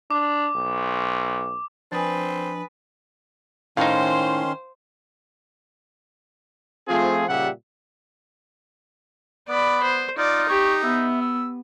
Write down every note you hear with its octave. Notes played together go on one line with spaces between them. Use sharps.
D4 D6
B1
F3 C4 D4 B4 G#5 D#6 A6
A2 D#3 C#4 D#4 C5 F5 C6
F3 A3 C4 F4 G#4
A#2 C#3 G3 G4 E5 F#5
B3 D5 B5
C5
D#4 F4 D5
G4 C#6
B3 E5
E6